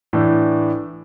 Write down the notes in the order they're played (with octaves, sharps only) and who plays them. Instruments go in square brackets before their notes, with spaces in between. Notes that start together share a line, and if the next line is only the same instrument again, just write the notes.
[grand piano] A2 E3 A3 D4